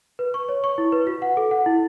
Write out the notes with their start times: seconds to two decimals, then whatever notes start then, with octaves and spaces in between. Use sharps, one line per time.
0.19 B4
0.34 C#6
0.49 C#5
0.64 C#6
0.78 E4
0.92 B4
1.07 F#4
1.22 F#5
1.37 A4
1.51 F#5
1.66 E4